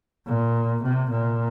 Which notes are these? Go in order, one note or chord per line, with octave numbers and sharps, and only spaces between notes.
A#2
C3
A#2